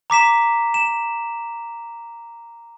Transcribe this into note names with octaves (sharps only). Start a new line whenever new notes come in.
A#5 D6 B6 E7
E7